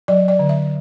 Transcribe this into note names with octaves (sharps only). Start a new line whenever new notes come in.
F#3 D5
D5
D3
E5